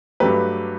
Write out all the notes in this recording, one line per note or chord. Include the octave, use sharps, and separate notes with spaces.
G2 F#3 A3 G4 B4